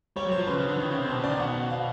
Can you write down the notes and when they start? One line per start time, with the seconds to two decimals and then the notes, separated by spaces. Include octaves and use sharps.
0.16 G3 C#5
0.26 F#3
0.32 C5
0.37 F3
0.47 C#3 B4
0.58 C#3
0.67 D3
0.79 D#3
0.88 C#3
0.99 C3
1.08 B2 C5
1.19 C#3
1.24 D5
1.29 D#3
1.39 B2 F#5
1.70 F5